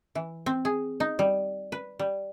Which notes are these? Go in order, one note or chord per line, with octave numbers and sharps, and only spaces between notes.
E3
C4
G#4
D#4
G3
B4
G3